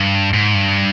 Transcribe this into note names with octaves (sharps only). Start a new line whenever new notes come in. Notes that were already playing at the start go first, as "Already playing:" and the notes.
Already playing: G2
G#2
G2